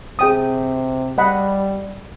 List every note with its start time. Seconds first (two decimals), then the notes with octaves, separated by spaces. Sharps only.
0.19 C3 G#4 G5 D#6
1.18 G3 D#5 F#5 B5